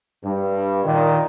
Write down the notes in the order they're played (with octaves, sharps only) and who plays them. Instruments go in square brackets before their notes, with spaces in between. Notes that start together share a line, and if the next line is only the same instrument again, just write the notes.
[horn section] G2
A#2 D#3